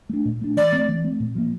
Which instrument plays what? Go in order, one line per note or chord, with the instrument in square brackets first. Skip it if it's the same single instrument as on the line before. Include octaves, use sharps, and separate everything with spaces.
[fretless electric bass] A3 D4
A#2
A3 D4
[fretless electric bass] E3 [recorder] D5
[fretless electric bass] A3 C4
E3
A3 C4
A#2
F3 A#3